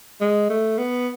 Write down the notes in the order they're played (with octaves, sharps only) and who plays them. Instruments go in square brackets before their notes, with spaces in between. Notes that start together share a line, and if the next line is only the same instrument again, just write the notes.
[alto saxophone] G#3
A3
B3